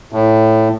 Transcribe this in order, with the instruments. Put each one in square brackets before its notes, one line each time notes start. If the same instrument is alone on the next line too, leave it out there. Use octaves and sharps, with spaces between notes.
[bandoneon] A2